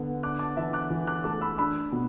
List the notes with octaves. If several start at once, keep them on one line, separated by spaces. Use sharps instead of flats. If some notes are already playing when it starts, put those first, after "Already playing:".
Already playing: D3 B3
D4 D6 F#6
A5 D6
E3 E5 A5
D6 F#6
E3
D6 F#6
A3 A5 D6
B5 E6
D4 B5 E6
B2